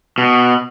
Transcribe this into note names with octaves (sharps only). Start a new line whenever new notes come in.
B2